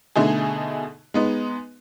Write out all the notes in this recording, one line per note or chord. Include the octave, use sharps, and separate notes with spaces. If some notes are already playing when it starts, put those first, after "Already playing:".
B2 D3 A3 D#4 G#4
G#3 B3 D#4